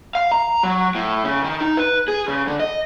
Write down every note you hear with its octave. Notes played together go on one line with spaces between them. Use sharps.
F5
A#5
F#3
A2
C#3
D#3
D#4
B4
G#4
C#3
D3
D#5